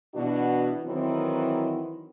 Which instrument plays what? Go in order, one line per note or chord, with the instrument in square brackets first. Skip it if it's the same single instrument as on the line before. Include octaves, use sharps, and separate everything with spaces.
[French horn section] B2 E3 D4 F#4
D#3 E3 F#3 C4